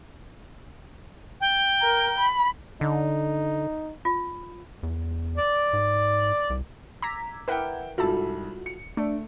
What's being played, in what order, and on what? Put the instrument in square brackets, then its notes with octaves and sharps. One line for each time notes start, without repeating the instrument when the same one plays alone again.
[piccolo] G5
[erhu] A#4
B5
[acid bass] D3 [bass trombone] D#4
[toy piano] F4
[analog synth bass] E2
[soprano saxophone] D5
[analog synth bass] G#2
C2
[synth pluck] A#5 B6 [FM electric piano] D6 E6 G#6
[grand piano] E4 G5 [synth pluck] A#4 B4 F#5
[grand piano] C2 G#2 G3 [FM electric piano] F4 F#4 [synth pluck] A4 A5
[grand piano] C#7
[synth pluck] A3 [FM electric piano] D4 D5